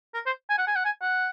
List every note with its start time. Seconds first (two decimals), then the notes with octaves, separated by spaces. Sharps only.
0.14 A#4
0.26 C5
0.49 G#5
0.58 F#5
0.67 G#5
0.76 F#5
0.85 G#5
1.02 F#5